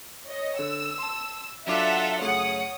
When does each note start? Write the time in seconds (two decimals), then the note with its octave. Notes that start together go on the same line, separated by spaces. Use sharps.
0.27 C#5 D#5
0.59 D3 E6
0.98 A5 C6
1.67 F#3 D4 F4 A4 E5 F#5 A5 D6
2.21 F#2 C#3 A3 C#5 F#5 D#6